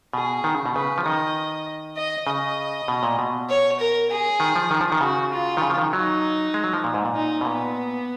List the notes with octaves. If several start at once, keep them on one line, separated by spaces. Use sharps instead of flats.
B2 G#4
D#3
C#3
B2
C#3 B4
F3
D#3 D#5
D#5
C#3 D#5
B2
A#2
B2
C#5
A#4
G#4
D#3
F3
D#3
F3
D#3
C#3 F#4
F4
D#3
C#3
F3
D#3
F#3 D#4
G#3
F#3
F3
A#2
G#2
A#2
D#4
B2
A#2 B3